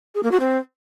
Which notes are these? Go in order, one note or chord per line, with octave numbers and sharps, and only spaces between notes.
G#4
A#3
F#4
C4